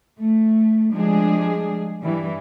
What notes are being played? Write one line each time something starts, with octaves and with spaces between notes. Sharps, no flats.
A3
F3 G3 G#3 D4 G#4
G2 E3 G3